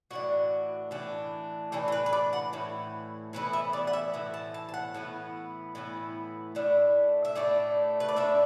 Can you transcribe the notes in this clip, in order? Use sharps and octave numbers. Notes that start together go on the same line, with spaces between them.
A2 E3 D4 F#4
A2 E3 D4
A2 E3 D4 A4
A4
B4
B4
D5
F#5
A2 E3
A2 E3 B3 E4
E5
D5
F#5
E5
A2 E3
A5
A5
A5
F#5
A2 E3 B3 E4
A2 E3 B3 E4
A2 A3 D4 E5
E5
A2 A3 D4 D5
B4
D5
A2 A3 D4 E5